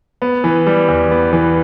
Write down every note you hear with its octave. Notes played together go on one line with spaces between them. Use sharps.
B3
E3
G3
E2
B3
E3